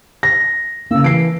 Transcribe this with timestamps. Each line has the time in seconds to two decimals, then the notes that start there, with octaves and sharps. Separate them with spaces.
0.23 A#6
0.91 C#3 A#3 E6
1.04 E3 C7 D7